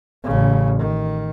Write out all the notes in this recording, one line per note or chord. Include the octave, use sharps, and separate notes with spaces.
A1 C#3
D#3